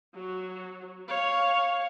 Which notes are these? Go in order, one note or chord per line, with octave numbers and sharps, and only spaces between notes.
F#3 F#4
C#5 F5